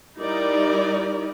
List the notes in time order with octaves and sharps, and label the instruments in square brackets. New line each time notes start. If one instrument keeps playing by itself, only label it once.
[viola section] G3 D#4 E4 A#4 D5